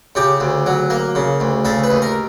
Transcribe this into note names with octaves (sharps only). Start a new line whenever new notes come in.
C#3 G4
D2
F#3
A#3
C#3
D2
C#3 A4
B4
D#2
A#4